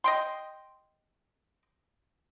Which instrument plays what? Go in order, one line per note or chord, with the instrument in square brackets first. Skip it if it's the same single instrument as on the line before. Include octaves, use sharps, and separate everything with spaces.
[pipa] D#5 G5 C6